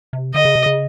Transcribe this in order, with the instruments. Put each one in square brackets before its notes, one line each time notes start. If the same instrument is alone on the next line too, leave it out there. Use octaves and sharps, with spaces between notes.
[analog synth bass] C3
[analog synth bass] D3 [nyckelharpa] D#5
[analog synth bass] C#3
C3
C#3